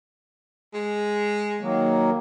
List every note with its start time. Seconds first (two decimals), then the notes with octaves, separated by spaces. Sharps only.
0.74 G#3
1.61 D#3 F#3 A#3